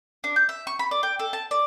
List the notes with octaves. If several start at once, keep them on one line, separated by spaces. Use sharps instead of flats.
D4
G6
E5
C#6
B5
D5
G5
A4
A5
D5